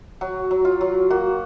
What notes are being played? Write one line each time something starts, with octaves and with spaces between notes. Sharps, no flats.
F#3 F#4
F#3
F4
F#3
A#3 F#4